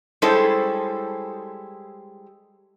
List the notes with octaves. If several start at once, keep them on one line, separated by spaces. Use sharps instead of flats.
G3 G#3 C#4 E4 A4 C5